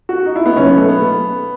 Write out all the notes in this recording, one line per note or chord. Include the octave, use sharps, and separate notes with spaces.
F#4
D#4
E4
B3
B1 B2 C#4
B3
A3
B3